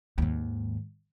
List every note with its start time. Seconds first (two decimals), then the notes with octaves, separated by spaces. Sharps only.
0.18 D#2 G#2